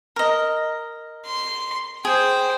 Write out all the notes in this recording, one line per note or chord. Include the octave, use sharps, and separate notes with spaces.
A#4 D#5
C6
G#4 C5 G5